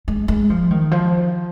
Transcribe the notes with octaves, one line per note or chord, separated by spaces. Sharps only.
G#3
G#3
F3
D#3
F3